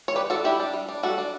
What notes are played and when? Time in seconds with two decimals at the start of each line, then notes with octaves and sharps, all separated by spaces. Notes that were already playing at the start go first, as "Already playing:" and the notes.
0.08 C#5
0.15 G3 G4 B4
0.30 D4 F#4 A4
0.44 G3 E4 G4
0.60 D4
0.73 G3
0.89 D4
1.03 G3 F#4 A4
1.18 D4